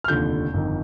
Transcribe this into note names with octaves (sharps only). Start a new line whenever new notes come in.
F6
F1 D#2 D3 F3 G6
G1 F2 D#3